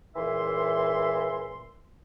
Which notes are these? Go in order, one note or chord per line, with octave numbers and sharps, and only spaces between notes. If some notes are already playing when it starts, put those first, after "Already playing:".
C#2 A#2 E3 E5 C6